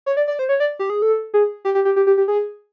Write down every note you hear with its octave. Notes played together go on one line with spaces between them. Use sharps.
C#5
D5
D5
C5
C#5
D5
G4
G#4
A4
G#4
G4
G4
G4
G4
G4
G4
G#4